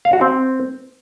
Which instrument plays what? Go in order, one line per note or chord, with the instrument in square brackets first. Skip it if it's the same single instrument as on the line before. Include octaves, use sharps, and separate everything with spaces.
[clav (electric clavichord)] F5
F#4
C4